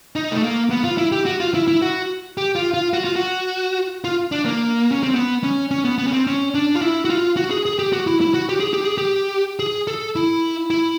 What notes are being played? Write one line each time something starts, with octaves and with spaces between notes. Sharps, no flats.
D#4
A3
A#3
B3
F4
E4
G4
F#4
F4
E4
E4
F#4
G4
F4
F4
F#4
F4
F#4
F4
D4
A#3
C#4
C4
B3
C#4
C#4
B3
B3
C#4
C4
C#4
D4
F4
E4
F#4
F4
F#4
G#4
G#4
G4
F#4
E4
E4
F#4
G4
G#4
G4
G#4
G4
G#4
A4
E4
E4